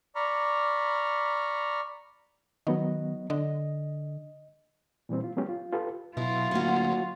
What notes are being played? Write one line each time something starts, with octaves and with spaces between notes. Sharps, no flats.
D5 A#5 B5 C#6 F6
D#3 F#3 B3 D#5
D3 D#5
A#2 E3 G3 C4
F4
F#3 G#3 B3 C#4 G4
F4
F4 G4 A4 B4
B2 F#3 E4 F4
D1 D2 A#3 C#4 F#4